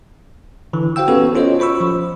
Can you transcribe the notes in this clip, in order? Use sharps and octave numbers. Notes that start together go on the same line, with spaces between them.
D3 E3
F#4 C5 F5 G5 E6
B3 C#4 F#4 G4 A4 B4
C#4 F4 A4 C5 C#5 D#5
F4 C5 B5 C#6 E6
F3